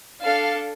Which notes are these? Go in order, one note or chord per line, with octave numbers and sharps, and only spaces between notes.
D4 A4 F5